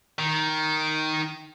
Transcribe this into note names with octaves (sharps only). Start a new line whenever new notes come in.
D#3